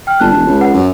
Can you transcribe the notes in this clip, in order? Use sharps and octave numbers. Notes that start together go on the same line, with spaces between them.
G5 F6
G1 A5 F#6
E1
C#2
B4 F#5
F#2